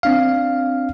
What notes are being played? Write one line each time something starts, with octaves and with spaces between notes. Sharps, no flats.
C4 D4 F5